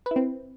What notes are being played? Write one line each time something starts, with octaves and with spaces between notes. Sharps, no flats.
B4
E4
C4